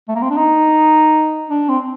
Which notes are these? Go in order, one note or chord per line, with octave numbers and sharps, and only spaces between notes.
A3
A#3
C4
D4
D#4
D4
C4